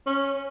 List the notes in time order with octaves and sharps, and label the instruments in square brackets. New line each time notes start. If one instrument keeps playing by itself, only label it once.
[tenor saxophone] C#4